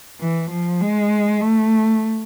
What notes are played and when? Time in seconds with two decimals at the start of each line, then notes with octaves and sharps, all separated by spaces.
0.20 E3
0.50 F3
0.81 G#3
1.41 A3